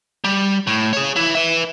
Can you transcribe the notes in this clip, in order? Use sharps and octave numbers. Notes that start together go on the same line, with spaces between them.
G3
A2
G#4 C#5
E3 E4
B4 E5